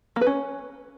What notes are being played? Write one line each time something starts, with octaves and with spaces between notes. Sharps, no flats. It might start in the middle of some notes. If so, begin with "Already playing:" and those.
A#3
B4
C#4